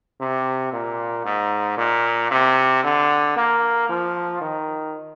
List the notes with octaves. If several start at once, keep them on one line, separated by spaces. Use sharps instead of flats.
C3
A#2
G#2
A#2
C3
D3
A#3
F3
D#3